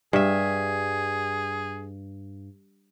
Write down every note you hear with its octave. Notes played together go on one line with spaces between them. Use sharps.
G2 G#4 E5